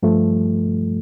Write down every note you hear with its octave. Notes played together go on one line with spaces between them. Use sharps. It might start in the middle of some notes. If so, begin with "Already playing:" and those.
G2 F3 A3